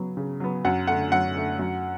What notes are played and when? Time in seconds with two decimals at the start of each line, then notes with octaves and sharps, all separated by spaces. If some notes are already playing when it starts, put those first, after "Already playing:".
Already playing: C#3 F#3 B3
0.17 C#3
0.40 F#3 B3
0.65 F#2 F#5
0.87 D3 A3 F#5
1.12 F#2 F#5
1.36 D3 A3
1.59 F#2